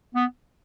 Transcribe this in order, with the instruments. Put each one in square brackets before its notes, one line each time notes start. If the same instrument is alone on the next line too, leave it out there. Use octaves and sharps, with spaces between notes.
[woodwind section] B3